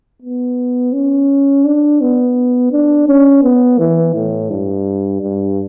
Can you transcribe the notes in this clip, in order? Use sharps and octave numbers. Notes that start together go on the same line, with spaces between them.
B3
C#4
D4
B3
D4
C#4
B3
E3
A2
G2
G2